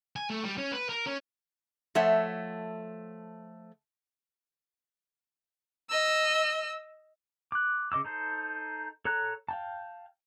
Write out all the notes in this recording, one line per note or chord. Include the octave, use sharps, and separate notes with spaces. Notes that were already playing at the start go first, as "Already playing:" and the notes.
G#5
A3
G3
C#4
B4
A#4
C#4
F3 A3 C#5 E5 F#5
D#5 E6
D6 F#6
C#3 D#5 D6 E6
D#4 A4 C5
A4 C#5 A#5 F#6
F5 G5 A5